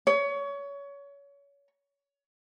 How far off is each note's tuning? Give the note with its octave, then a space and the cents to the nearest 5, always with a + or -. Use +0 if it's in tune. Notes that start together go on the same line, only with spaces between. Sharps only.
C#5 +25